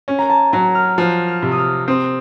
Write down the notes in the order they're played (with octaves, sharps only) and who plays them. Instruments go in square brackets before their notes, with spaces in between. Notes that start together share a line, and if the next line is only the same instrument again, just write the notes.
[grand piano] C#4
[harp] A#5
A5
[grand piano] F#3 [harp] A#5
[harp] F6
[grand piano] F3 [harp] F#6
[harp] F6
[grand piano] C3
[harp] D#6
F6
[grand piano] C4 [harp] D#6